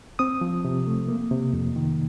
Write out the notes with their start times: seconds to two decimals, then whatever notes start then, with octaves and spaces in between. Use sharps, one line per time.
0.19 C4 D#6
0.41 F3
0.65 C3
0.87 A3
1.08 A#3
1.31 C3
1.53 F2
1.76 D#3